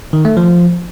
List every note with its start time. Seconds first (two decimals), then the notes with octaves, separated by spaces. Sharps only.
0.13 D#3
0.25 A3
0.37 F3